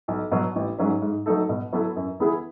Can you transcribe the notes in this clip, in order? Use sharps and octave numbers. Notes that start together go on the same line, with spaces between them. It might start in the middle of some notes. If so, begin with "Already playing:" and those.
B1
B2 F#3
A1
G#2 F#3 C#4
G#2
F#3 A3 D#4 A4
B2
F#3 B3 E4 A4
F#2
E3 B3 E4 G#4